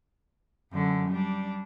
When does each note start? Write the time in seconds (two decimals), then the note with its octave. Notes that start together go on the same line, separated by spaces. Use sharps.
0.72 F#2 D3
1.09 G3 D4